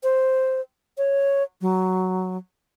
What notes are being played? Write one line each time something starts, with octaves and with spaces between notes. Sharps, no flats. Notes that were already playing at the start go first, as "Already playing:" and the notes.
C5
C#5
F#3